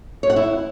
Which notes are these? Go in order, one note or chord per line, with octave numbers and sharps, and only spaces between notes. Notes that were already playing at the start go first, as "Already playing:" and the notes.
C#5
F#5
E4